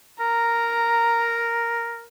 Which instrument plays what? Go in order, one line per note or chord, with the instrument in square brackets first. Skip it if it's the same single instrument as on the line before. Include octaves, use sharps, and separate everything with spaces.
[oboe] A#4 [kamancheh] A#5